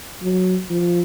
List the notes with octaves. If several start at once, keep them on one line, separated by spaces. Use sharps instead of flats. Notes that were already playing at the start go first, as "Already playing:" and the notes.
F#3
F3